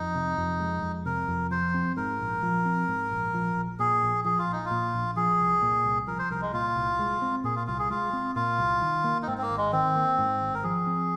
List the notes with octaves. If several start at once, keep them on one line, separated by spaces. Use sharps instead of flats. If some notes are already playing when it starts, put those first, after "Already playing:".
Already playing: F2 D#4
C3
F2
G#3
F2
C3 A#4
F2
F3 C5
C4
G#2 A#4
A#1
F3
C4
G#2
A#1
F3
A#1
A#2 G#4
A#1
F3 G#4
F4
A#1 D#4
F4
A#2
A#1
F3 G#4
C2
A#2
C2
F3 A#4
C5
C2 A#4
G#3
A#2 F4
C2
G#3
C4
A#2 G#4
F4
C2 F4
G#4
G#3 F4
C4
A#2 F4
C2
D#3
A#3
D#4
G#2 C4
C4
A#3
G#1
G#3
D#3 C4
A#3
G#2
G#1
A#4
F3 G#4
C4